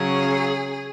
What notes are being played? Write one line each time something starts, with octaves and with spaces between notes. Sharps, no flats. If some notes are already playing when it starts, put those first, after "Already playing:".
Already playing: C#3 F#3 C#4 G#4